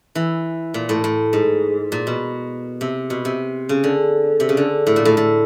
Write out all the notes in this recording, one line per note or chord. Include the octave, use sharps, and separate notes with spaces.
E3
A#2
A2
A2
G#2
A#2
B2
C3
B2
C3
C#3
D3
C3
C#3
D3
A2
A#2
A2
A2